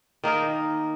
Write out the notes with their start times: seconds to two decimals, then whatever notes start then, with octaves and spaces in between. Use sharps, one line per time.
0.24 D#3 A#3 D#4 A#4